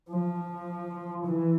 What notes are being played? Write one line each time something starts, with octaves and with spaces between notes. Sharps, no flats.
F3
E3